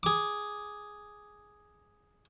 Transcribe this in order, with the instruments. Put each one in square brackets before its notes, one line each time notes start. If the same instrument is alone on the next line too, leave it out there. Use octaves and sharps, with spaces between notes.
[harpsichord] G#4 D6